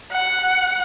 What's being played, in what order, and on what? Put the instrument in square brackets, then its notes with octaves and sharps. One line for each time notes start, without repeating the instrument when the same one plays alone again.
[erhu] F#5